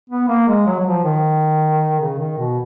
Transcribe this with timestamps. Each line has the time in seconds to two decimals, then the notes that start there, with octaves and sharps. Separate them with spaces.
0.10 B3
0.28 A#3
0.48 G#3
0.66 F#3
0.79 F#3
0.86 F3
1.04 D#3
1.99 C#3
2.18 D#3
2.37 B2